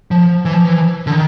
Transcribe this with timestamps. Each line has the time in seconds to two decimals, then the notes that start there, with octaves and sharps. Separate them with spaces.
0.11 F3
0.45 E3
0.54 F3
0.64 E3
1.07 D3
1.12 D#3